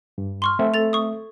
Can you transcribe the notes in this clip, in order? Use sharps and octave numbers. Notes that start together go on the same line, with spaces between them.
G2
C6 C#6 F6
A3 C4 E5
A4 A6 F7
C#6 D#6